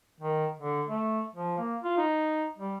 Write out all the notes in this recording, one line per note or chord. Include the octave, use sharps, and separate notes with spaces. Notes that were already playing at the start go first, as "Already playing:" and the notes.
D#3
D3
A3
F3
A#3
F4
D#4
G3